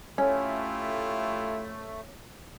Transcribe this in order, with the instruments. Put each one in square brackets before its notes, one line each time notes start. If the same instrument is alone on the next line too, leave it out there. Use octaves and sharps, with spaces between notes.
[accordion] A3 [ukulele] C#4 [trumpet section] E4 F4 G4 [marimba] C#5